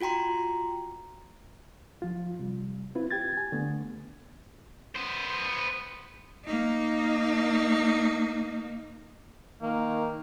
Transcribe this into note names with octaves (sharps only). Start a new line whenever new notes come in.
F4 F#4 G5 A#5 C6
F3 F4
C3 G3
C4 E4 F4 B4
G4 G5 G#6 A6
G#5
D3 A3 B3
B3 C5
A#3 D#4
D#3 A#3